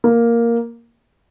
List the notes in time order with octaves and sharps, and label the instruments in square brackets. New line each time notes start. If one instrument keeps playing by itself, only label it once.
[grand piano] A#3